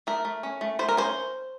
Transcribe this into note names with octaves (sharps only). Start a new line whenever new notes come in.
A3 A#4
A3
C#4
A3
A3 C5
A#4
C#4 C5